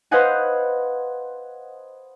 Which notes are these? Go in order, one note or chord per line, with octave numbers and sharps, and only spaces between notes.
B4 C5 D#5 F5 F#5 G#5